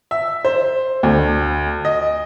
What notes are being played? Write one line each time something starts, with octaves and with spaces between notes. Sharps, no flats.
E5
C5
D2
D#5